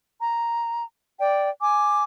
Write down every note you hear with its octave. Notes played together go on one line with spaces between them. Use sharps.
A#5
D5 G5
G#5 D6